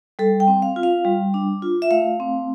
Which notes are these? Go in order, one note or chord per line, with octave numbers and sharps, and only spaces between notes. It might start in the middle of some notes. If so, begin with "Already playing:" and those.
G3 A4
G5
C4
F5
F4
F5
G3
D4
F4
E5
A3 F5
C4